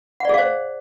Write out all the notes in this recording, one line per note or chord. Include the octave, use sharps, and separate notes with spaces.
G#4 C5 D5 F5 F#5